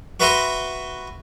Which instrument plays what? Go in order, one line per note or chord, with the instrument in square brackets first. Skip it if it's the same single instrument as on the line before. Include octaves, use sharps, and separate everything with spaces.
[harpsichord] F#4 B4 E5 A#5 C6